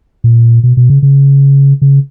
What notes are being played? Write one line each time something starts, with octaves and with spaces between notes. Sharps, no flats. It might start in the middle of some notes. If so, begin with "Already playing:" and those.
A#2
B2
B2
C#3
C#3
C#3